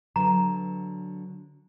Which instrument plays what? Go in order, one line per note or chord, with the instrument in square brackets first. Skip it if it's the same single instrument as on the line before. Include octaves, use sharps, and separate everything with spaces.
[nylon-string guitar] D3 F#3 B4 [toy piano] A#5